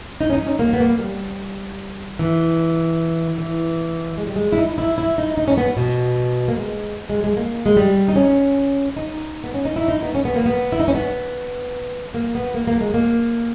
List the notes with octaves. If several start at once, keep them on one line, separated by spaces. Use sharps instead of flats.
D#4
C#4
D#4
C#4
A#3
B3
A#3
G3
E3
E3
G#3
G3
G#3
E4
D#4
E4
E4
D#4
D#4
C#4
B3
B2
A#3
G#3
G#3
G#3
A#3
G#3
G3
D#4
C#4
D#4
B3
C#4
D#4
E4
D#4
B3
C#4
B3
A#3
B3
E4
D#4
C#4
B3
A#3
B3
A#3
A#3
G#3
A#3